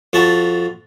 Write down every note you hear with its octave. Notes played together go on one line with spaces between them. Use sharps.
F2 F4 F#4 A5 B5